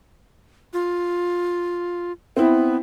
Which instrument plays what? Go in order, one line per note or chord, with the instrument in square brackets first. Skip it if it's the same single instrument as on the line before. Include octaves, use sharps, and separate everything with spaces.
[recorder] F4
[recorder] B3 [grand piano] C4 E4